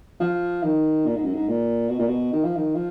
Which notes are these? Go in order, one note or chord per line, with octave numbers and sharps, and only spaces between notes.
F3
D#3
A#2
G#2
F#2
G#2
A#2
B2
A#2
B2
D#3
F3
D#3
F3